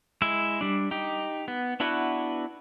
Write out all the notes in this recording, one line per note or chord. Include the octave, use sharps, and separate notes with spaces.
G#3 E4 E5
G3 D4
D#4 G4
B3
B3 D4 E4 F#4 B4